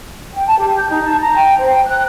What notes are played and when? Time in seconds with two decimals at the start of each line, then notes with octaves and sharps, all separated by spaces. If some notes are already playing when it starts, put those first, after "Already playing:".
0.34 G5
0.47 A5
0.59 G4
0.77 G6
0.90 D#4
1.04 A5
1.20 A#5
1.36 G5
1.57 C5
1.74 G5
1.86 F#6